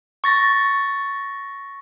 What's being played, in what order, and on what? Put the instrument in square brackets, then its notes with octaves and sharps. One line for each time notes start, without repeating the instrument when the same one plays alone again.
[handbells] C#6 A6 A#6